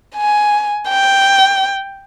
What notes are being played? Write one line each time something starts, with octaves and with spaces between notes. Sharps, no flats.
G#5
G5